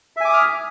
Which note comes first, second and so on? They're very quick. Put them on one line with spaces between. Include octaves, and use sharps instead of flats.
E5 G#5 D6 D#6 F6